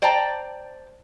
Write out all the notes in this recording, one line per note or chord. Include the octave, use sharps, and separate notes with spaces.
C5 D5 G5 A5 A#5